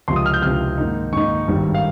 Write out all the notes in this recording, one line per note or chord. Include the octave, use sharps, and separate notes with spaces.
C#2 C3 F3 C6
D#6
F6
G6
C#2 C3 F3 F6
G#2 D#3 A#3 D#4
G#2 D#3 A#3 D#4 C#6
G#1 G2 D#3 G3
F5